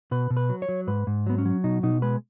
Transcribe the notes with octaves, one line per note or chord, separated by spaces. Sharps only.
B2 B4
B2
B4
F#3
C#5
F#3
G#2 B4
G#2
F#3 B3
C#4
F#3
B2 D#4
B2 D#4
G#3 B4